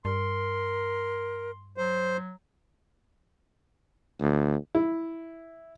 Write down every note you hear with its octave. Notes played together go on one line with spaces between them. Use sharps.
G2 A#4 C6
F#3 C5
D2
E4